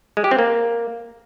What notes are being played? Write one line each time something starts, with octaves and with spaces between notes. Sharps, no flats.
G#3
G4
C4
A#3